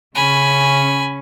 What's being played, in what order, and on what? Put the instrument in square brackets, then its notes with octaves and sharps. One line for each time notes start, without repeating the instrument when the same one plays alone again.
[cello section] C#3 C#4 [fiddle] G#5 B5